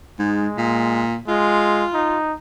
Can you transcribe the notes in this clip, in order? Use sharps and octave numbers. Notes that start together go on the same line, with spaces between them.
G#2 G#3
A#2
G#3 F4
D#4